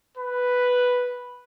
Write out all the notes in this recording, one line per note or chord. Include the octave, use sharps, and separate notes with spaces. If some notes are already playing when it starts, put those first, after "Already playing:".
B4